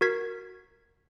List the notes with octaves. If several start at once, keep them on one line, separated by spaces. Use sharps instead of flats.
F#4 A#4 G#6 B6 C7